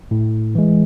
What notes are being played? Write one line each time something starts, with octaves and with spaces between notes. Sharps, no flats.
A2
E3 G#3